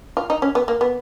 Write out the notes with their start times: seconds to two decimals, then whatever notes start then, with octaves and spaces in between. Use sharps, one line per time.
0.17 F4
0.30 D#4
0.42 C#4
0.55 B3
0.68 A#3
0.81 B3